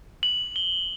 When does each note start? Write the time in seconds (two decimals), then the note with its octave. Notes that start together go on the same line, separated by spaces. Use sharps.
0.23 F#7
0.56 G7